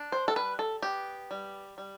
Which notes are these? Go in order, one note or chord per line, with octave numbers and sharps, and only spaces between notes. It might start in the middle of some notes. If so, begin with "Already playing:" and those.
Already playing: D4
C5
A4
G3 B4
A4
B3 G4
G3
G3